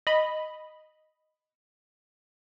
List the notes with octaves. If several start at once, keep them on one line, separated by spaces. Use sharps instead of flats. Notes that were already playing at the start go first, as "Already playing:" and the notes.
D#5 B5